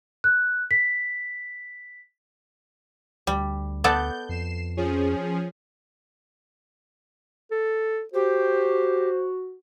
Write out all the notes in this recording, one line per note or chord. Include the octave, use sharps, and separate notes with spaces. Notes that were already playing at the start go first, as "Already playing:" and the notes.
F#6
B6
D2 G3
B3 A4 D5 G6
F2 C7 E7
F3 C#4 G#4
A4
F#4 G4 C5